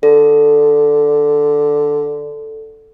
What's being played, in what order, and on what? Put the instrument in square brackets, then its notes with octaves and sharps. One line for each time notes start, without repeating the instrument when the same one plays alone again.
[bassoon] D3 [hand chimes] A4